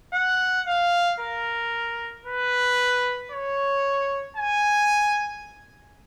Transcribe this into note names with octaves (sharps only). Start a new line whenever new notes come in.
F#5
F5
A#4
B4
C#5
G#5